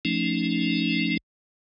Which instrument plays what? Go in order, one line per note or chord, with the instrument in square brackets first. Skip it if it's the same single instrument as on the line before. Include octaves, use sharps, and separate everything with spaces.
[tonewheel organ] F3 A3 C#4 D#4